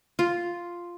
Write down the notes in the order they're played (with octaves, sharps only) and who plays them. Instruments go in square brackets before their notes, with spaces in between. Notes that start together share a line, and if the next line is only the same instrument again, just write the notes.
[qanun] F4